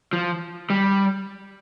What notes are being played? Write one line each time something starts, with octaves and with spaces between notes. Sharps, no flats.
F3
G3